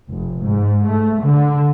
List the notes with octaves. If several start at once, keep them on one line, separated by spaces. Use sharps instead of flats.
F1
G#2
A3
D3